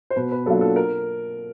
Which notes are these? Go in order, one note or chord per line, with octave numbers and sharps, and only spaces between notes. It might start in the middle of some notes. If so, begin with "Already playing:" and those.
C5
B2 B4
B4
F#3 A#3 D4 F4 A4
A4
A#4